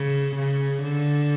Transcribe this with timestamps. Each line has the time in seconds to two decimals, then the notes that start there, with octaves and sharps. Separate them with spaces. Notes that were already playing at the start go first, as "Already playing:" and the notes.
Already playing: C#3
0.36 C#3
0.82 D3